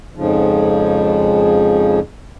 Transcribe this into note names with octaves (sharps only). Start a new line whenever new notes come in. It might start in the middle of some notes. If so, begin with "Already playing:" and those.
F2 G#2 C#3 F3